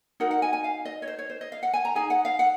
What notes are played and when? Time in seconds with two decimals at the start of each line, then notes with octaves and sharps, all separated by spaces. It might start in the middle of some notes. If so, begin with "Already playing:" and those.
0.20 D#4 F#4 A#4 F#5
0.31 F#5
0.42 G#5
0.53 G#5
0.64 F5
0.85 D#5
1.02 C#5
1.07 C5
1.19 C#5
1.30 C5
1.41 D#5
1.52 F5
1.63 F#5
1.73 G#5
1.85 A#5
1.95 D#4 G#4 G#5
2.10 F#5
2.25 F5
2.39 F#5